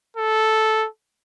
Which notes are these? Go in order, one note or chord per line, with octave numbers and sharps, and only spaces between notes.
A4